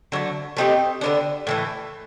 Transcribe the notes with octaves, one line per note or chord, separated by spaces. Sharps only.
D3 F#3 A3
A3 C4 D#4 G4
D3 F#3 B3 D4
A2 E3 A3